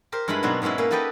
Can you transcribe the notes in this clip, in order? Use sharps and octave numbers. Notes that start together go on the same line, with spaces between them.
G4 A#4 C5
G2 G#3 E4 B4 B5
B2 F#3 C4 D4 D#4
G#2 B2 G#3 C#4 E4
A#3 C#4 B4
F#4 G4 A4 B4 D#5 G5